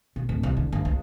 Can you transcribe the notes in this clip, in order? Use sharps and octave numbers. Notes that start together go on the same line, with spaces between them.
B2
D1
C2
D3
G1
C#2